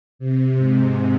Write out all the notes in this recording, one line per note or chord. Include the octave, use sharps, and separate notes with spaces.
C3
G#2